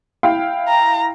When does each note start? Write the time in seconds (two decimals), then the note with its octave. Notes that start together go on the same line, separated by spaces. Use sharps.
0.23 E4 F5 G5
0.68 A#5